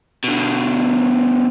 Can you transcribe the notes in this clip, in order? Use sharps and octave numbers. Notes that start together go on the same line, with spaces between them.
B2 D3